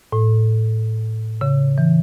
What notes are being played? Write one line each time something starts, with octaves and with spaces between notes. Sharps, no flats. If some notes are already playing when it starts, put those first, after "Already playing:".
A2
C#3
E3